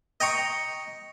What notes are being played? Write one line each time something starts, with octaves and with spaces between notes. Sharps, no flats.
D#5 G5 A#5 C#6